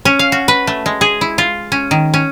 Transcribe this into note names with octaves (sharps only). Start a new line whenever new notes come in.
C#4
F5
F#4
B4
A3
G#3
G#4
E4
F4
C#4
D#3
C#4